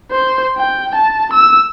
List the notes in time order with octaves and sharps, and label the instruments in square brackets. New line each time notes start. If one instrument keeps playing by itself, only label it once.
[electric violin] C5
G5
A5
E6